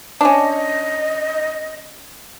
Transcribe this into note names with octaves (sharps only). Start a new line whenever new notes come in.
C#4 D4 D#5